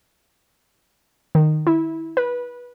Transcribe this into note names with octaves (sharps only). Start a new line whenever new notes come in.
D#3
E4
B4